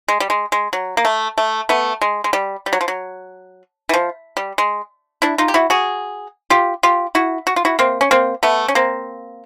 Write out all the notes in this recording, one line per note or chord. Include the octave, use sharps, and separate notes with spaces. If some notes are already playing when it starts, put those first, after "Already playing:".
G#3
G3
G#3
G#3
F#3
A#3
A3
A3
A3 B3
G#3
G#3
G3
G3
F#3
F3
F#3
E3
F3
G3
G#3
D4 E4
D#4 F4
G4
E4 F#4
F#4 G#4
F4 G4
F4 G4
E4 F#4
F#4
F4
E4 F#4
A#3 C4
C#4
A#3 C4
A3 B3
C#4
A#3 C4